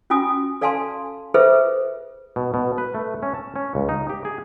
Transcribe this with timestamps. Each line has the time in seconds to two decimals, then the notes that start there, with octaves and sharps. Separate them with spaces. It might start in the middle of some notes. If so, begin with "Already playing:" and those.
0.10 C#4 F4 F#4 G#5 D#6
0.61 A4 D5 F5 G#5 A5 C6
1.34 F4 G#4 A4 B4 C5 E5
2.36 B2
2.54 B2
2.78 B4
2.95 A3
3.23 C#4
3.34 A5
3.56 C#4
3.75 C#2
3.89 D#4
4.09 G4
4.25 G#4